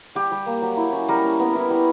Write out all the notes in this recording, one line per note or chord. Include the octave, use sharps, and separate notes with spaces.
G3 G4
G3
A#3
F#3
E4
C#4
G3 A#4
C#4
B3
E4
G3